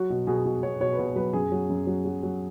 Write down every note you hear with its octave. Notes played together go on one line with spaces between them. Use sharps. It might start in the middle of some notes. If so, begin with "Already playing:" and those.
Already playing: F#3 F#4
B2
B2 G#4
B2
B2 C#5
B2 C#5
B4
B2 C#5
F#3 B4
F#2 G#4
F#3
F#2
F#3
F#3
F#3